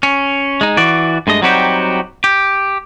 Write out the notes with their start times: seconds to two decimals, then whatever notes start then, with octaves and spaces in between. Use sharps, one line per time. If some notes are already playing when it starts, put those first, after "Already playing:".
0.03 C#4
0.61 G#3 D#4
0.77 E3 F#4 D5
1.27 G2 G#3 A3 D#5
1.42 F#3 G3 C4 D#4 F#4 G4
2.24 G4